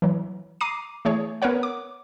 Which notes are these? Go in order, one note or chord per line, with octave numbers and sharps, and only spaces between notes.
E3 F#3
A#5 D6 C7 D#7
E3 A3 G#4 C#5
B3 A#4 B4 C#5 F#5
D6